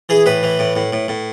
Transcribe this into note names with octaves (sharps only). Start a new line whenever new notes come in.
E3 G#4
A2 B4
E3
A2
A2
A2
A2